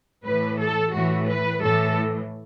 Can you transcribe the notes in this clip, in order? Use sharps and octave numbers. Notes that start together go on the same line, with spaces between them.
A2 E3 B4
A4
A2 E3 F#4
B4
A2 E3 A4